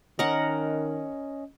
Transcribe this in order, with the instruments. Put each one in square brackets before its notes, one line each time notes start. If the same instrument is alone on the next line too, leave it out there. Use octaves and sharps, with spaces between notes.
[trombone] D#3 [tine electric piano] C#4 D#5 [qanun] A#4 F#5